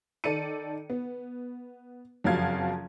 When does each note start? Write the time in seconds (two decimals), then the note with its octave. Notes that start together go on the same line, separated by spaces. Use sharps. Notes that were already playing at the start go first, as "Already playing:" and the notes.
0.24 D#3 A4 D5 C#7 D#7
0.90 B3
2.24 F#1 F2 F3 F#4 F5 G#6